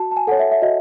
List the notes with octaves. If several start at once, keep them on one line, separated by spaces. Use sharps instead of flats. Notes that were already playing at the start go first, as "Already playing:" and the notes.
Already playing: F#4 A5
A5
G#5
A4 C#5 F#5
E5
E5
F#4 D#5